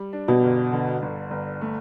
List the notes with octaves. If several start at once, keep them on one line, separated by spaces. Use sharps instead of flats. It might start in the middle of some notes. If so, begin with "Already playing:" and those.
Already playing: G3
D4
B2
G1
D3
G1
G1
A3